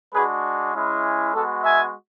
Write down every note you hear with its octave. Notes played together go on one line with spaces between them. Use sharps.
G#3 D4 F#4 G#4 B4
G#3 C#4 E4
G#3 B3 F#4 A4
E5 G#5